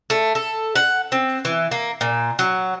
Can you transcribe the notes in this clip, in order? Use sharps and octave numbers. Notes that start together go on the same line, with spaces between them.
A3
A4
F#5
C4
E3
A#3
A#2
F#3